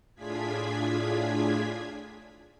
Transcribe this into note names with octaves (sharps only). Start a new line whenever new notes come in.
A2 D4 F4 G#4 G#6 B6